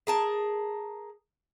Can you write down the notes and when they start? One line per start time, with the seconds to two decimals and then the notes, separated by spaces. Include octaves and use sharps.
0.07 G#4 A#4 A5